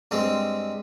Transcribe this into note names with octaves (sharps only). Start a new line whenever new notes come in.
G2 G#3 C4